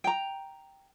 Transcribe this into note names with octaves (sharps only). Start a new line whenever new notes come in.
G5 A#5